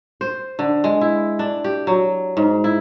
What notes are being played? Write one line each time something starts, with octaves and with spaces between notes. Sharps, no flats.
C5
D3
G#3
E4
D4
G4
F#3
G#2
E4